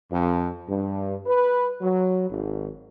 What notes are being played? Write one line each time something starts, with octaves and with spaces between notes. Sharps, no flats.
F2
G2
B4
F#3
G#1